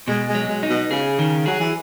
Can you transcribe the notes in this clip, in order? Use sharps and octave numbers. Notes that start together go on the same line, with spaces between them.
B2 G#3
G#3
F#3
G#3
D#4
B2
C#3 G#4
D#3
F#3 G#4
E3